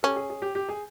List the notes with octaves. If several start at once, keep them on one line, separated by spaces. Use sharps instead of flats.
C#4 G4 A4
G#4
G#4
G4
G4
G#4